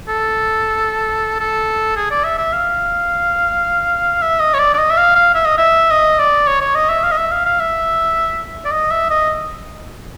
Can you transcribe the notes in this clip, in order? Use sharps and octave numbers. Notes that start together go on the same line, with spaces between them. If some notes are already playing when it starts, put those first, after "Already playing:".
A4
A4
G#4
D5
E5
E5
F5
E5
D#5
C#5
D5
D5
D#5
E5
F5
F5
E5
D#5
E5
D#5
D5
C#5
C#5
D#5
E5
F5
D#5
E5
F5
F5
E5
D5
D#5
E5
D#5